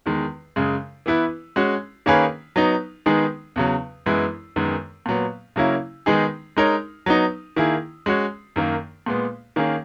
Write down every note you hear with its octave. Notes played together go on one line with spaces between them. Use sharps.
E2 D#3 G#3
F#2 C#3 G#3
E3 B3 E4 B4
G#3 C#4 F#4
D#3 A#3 C#4 G#4 B4
F#3 B3 D#4
D#3 G#3 B3 D#4 G#4
E2 C#3 F#3
F#2 E3 G#3 B3 E4
F#2 D#3 G#3 B3
A#2 F#3 B3
C#3 F#3 A#3 C#4 E4
D#3 G#3 B3 D#4 G#4
G#3 D#4 A#4 C#5
F#3 B3 D#4
D#3 A#3 E4 G#4
G#3 C#4 F#4 C#5
F#2 D#3 A#3
A#2 G#3 B3
D#3 A#3 C#4 G#4